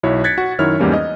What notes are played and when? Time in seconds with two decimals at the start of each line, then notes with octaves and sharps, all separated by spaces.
0.03 B1 E4 F#4 C#5
0.24 F#6 G#6 A6 B6 C#7
0.38 F#4 F#5
0.59 F#2 D#3 E4 C#5 F6
0.80 E2 G#2 G3 A#3 C#4
0.94 D#5